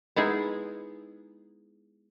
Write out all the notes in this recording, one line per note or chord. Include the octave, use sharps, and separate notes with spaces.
G#3 B3 D#4 E4 G#4